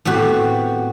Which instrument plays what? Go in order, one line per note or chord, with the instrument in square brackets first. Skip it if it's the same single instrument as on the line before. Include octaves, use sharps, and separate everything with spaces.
[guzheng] A2 B3 C4 F#4 G4